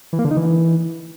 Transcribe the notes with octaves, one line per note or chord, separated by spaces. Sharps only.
E3
A#3
D3
D#4
E3